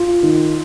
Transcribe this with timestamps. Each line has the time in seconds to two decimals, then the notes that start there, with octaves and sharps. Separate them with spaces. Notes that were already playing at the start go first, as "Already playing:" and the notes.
Already playing: F4
0.23 D#3